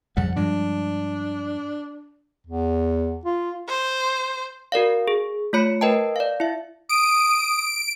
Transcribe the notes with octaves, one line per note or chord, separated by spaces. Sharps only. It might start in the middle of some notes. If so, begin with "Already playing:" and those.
F2 C#3 G3 F#5
G2 F3 G#3 D4
E2
F4
C5
F#4 A#4 D5 F5
G#4
A3 F4 C#5 B5 C#7
A#4 B4 D#5 G5 A5
D5 F5
E4 E5
D#6 D7